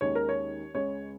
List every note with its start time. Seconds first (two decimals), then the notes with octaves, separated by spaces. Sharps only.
0.01 D#2 D#3 G#3 C#4 C#5
0.15 A#4
0.29 C#5
0.74 C#2 C#3 G#3 C#5